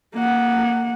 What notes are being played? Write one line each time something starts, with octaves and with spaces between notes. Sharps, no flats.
A#3 F#5